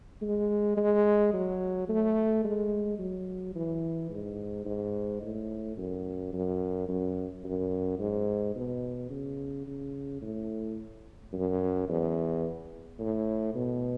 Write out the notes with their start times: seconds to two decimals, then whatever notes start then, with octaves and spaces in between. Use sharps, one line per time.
0.22 G#3
0.77 G#3
1.33 F#3
1.89 A3
2.44 G#3
2.99 F#3
3.56 E3
4.10 G#2
4.66 G#2
5.22 A2
5.77 F#2
6.33 F#2
6.89 F#2
7.44 F#2
7.99 G#2
8.56 B2
9.11 C#3
9.67 C#3
10.22 A2
11.33 F#2
11.89 E2
12.99 A2
13.55 B2